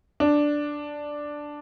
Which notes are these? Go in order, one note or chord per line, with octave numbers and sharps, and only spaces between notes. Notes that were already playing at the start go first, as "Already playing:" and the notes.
D4